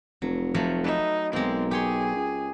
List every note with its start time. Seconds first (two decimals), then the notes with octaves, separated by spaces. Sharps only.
0.22 F1 F#3
0.54 F3 F#3 A3
0.84 D#4 B4 E5
1.33 B1 G#3 A#3 C4
1.71 G4 G#4 C#5 C6
2.15 C#2